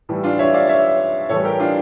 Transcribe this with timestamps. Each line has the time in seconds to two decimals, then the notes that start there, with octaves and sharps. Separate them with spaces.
0.09 A2 E3 G3
0.23 D4 F4
0.39 C#5 E5
0.54 D5 F5
0.69 C#5 E5
1.29 A2 E3 G3 A4 C#5
1.44 G4 A#4
1.59 D4 F4